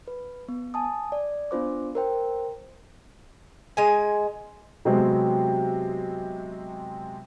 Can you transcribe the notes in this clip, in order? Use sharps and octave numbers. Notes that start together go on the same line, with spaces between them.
B4
B3
G#5 A5 D#6
D5
B3 D4 F4 C5 D6
A#4 C5 G5
G#3 G#5
C3 F#3 G#3 B3 C4